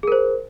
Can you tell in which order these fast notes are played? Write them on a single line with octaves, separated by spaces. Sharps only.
G#4 A#4 C5